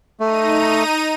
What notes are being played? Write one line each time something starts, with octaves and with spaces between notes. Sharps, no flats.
A3 D#4 A#5 D#7